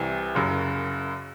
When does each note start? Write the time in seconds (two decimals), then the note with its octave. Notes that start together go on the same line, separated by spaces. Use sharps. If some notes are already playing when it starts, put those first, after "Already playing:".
Already playing: C2 C3 E3
0.35 F#1 F#2 C#3